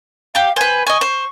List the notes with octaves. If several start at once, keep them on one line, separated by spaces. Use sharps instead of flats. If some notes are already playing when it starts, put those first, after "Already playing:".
G4 F5 D6
B4 C5 G#5
D#5 G#5 C#6
C5